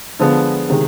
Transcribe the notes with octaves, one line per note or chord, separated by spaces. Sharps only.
D3 F3 G#3 B3
C3 D#3 G#3